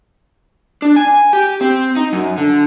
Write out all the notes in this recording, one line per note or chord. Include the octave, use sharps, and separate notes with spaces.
D4
G#5
G4
C4
D#4
F#2
D3